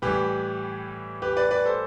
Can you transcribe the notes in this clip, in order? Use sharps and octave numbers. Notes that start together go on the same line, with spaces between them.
A2 E3 G3 G4 B4
G4 B4
B4 D5
B4 D5
A4 C5